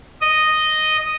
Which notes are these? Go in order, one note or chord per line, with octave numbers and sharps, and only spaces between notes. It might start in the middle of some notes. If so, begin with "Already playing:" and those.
D#5